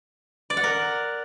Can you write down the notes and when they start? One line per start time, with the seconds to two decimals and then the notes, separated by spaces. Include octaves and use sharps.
0.50 D5
0.57 F#5
0.64 A#4